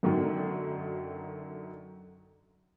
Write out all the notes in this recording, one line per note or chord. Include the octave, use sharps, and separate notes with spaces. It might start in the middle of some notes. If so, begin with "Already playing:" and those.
F#2 D3 D#3 F#3